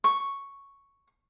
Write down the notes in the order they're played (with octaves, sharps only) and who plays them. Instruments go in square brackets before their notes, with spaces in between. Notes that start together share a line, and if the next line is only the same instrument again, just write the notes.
[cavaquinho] C#6